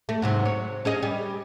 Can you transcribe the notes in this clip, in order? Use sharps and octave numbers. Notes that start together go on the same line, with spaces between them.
A3
G#2 C3 F#3
C#5
C#4 G#4 D#5
G3